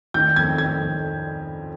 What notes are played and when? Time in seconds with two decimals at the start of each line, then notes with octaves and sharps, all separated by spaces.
0.14 D#3 G6
0.36 F2 G#6
0.58 D#3 G#6
0.81 F2